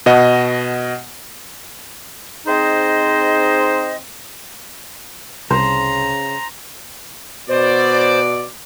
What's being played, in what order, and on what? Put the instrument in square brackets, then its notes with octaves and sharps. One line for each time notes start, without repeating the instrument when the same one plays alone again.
[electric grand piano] B2 D#5 F#5
[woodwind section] C4 D#4 G#4 C5 D#5
[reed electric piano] C2 [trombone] C#3 [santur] C5 [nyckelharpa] A#5
[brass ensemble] B2 D5 [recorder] C5